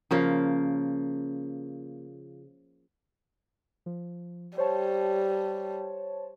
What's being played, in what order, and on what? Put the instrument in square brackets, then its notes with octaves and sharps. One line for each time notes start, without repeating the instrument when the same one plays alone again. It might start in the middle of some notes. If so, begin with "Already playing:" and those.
[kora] C#3 F3 A#3
[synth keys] F3
[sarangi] G3 [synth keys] C5 C#5 A5